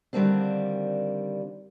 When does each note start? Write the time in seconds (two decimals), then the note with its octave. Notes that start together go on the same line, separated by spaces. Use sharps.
0.13 D3 D#3 G3 A#3 C4 D4